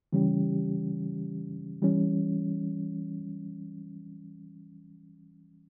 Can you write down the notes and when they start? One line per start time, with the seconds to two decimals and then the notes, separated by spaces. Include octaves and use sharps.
0.13 C#3 E3 G3 C#4 G4
1.82 E3 G3 C#4